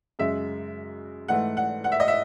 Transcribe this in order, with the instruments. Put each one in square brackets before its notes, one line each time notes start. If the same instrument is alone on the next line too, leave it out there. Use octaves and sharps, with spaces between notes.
[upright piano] F#2 C#3 G#3 E5
G#2 E3 A3 F#5
F#5
F#5
E5
D#5
E5